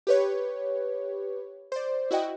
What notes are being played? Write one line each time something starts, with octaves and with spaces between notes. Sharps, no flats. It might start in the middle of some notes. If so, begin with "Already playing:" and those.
G4 B4 C#5
C5 D5
E4 F#4 D#5 G5